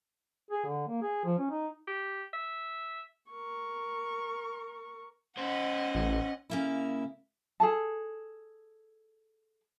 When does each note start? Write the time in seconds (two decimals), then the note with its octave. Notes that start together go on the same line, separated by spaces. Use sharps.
0.51 G#4
0.66 D3
0.88 A#3
1.02 G#4
1.25 F3
1.38 C#4
1.50 D#4
1.87 G4
2.33 E5
3.31 A#4 C#6
5.37 C#4 C5 D#5 F#5
5.95 A1
6.50 C#3 A#3 E4
7.60 G#4 A4 A5